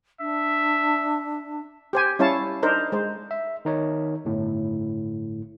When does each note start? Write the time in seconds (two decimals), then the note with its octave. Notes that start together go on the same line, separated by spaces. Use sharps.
0.21 D4 E5
1.93 G4 C5 G#5
2.19 G3 C#4 E4 C#5 F5 A5
2.63 D4 D#4 A#4 C5
2.92 G#3 C5
3.31 E5
3.65 D#3 D#4 C#5
4.25 G1 A2